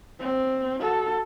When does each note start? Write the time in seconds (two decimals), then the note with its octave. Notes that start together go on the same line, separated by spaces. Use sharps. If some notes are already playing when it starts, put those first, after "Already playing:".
0.20 C4
0.81 F#4 A4